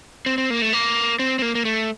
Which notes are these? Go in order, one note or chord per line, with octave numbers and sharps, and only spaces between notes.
C4
C4
A#3
A3
A#3
C4
C4
A#3
A#3
A3